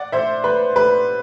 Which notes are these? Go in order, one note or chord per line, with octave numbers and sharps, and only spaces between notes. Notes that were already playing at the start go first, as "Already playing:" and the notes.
Already playing: D5 F#5
C5 E5
B4
B4